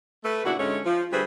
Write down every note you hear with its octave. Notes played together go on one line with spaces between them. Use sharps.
A3 B4
A#2 C#3 D4 E4 F#4
D2 G#2 G#3 A3 C#4 C#5
F3
D2 G3 A3 G#4 B4 C5